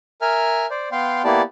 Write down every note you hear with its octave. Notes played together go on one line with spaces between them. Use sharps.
A#4 E5 G#5 F6
C5 D5
B3 F5 G5 C6
A#3 B3 E4 G4 D5 A5